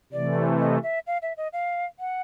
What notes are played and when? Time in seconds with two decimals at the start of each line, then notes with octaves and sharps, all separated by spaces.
0.12 C3 E3 A3 D5
0.59 D#5
0.83 E5
1.07 F5
1.22 E5
1.37 D#5
1.53 F5
1.99 F#5